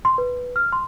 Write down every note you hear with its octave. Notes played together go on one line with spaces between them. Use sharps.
C6
B4
F6
C6